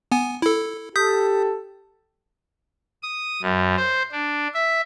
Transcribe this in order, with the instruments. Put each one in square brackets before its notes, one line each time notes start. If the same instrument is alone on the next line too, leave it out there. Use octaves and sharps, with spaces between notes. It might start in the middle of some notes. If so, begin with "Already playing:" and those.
[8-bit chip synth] B3 G#5
E4 A4
[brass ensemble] G4 A4 [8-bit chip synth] D#6 G6 B6
[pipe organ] D#6
F#2
C5
D4
E5